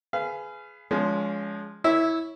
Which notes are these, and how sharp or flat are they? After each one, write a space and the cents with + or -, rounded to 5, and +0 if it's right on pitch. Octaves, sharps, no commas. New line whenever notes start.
G#4 +15 B4 +20 F5 -25
F3 +0 G#3 +0 C#4 +35
E4 -15 C#5 +0 E5 +0